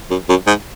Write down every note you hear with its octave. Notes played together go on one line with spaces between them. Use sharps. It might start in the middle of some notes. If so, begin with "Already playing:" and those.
F#2
F#2
G#2